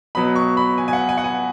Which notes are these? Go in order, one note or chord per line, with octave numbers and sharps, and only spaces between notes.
B2 F#3 B3 B5
C#6
B5
G#5
G#5
F#5
G#5
F#5
G#5